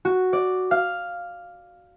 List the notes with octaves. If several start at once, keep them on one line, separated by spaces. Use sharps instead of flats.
F#4
D5
F5